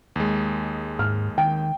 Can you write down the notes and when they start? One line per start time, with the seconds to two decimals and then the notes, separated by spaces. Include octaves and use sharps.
0.16 D#2 G#3
0.99 G#2 F6
1.38 D#3 G5